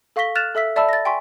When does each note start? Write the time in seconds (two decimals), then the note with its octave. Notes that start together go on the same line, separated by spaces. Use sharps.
0.16 A4 F5 C#6 A#6 B6 G7
0.35 F6 F#6 A6 E7 F7
0.55 A4 E5 E6 B6
0.76 D5 E5 A5 B5 E6
0.89 A6 A#6
1.05 G5 G#5 C6 C#6 B6 D7